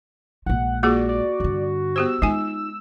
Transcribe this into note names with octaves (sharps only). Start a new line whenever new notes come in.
A#1 G#3 F#5
A#3 F4 F#4 G#4 D5
D5
G2 D3
B3 G4 C5 E6
G#3 D#4 F4 G#5